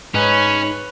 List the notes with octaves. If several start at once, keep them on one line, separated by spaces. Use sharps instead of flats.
G#2 C#4 D#4 B4 C#5 G#5